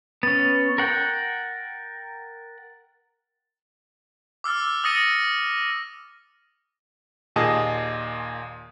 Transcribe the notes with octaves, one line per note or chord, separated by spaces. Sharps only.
B3 C#4 A6
A#4 F#5 G5
D6 E6 F6 A6
D#6 E6 A6 A#6 C#7 D#7
D#2 A#2 G#4 D#5 A5 D#6